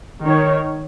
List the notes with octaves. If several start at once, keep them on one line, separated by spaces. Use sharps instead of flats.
D#3 C#5